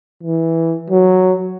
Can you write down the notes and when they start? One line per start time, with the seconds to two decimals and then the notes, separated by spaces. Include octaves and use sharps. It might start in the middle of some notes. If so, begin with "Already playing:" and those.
0.23 E3
0.90 F#3